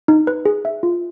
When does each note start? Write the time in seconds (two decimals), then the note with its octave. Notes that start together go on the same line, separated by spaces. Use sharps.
0.08 D#4
0.27 B4
0.45 G#4
0.65 E5
0.83 F4